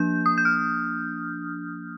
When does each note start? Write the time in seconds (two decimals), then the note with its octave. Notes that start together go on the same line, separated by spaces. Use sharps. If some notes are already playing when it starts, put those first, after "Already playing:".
Already playing: F3 A#3 D4 G6
0.26 D#6
0.38 G6
0.45 F6